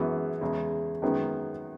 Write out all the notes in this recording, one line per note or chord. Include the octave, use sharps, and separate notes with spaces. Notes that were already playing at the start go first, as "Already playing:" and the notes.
Already playing: F#2 E3 G#3 B3 F#4
E2 C#3 G#3
F#2 D#3 G#3 B3